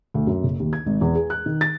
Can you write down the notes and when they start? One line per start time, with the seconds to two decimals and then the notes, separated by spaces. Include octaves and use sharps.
0.14 D2
0.27 F#2
0.43 F#1
0.59 D#2
0.73 G#6
0.86 G#1
1.01 E2
1.15 G#4
1.30 F#6
1.46 D#3
1.61 A6